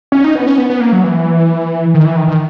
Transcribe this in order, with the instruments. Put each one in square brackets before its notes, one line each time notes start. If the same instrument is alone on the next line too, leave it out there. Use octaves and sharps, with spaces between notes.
[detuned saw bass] C#4
D#4
B3
C#4
B3
B3
A#3
F#3
E3
D#3
E3
D#3
D#3